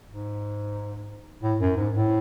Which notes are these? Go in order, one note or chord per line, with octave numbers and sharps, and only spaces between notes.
G#2
A2
F#2
G#2
A2